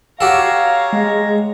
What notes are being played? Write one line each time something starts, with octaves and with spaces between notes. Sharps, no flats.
F#4 G4 A4 C#5 F5 A#5
G#3